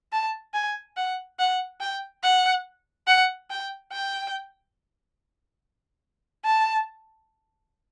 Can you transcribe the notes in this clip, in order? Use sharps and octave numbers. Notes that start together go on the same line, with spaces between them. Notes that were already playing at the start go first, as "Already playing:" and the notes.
A5
G#5
F#5
F#5
G5
F#5
F#5
G5
G5
A5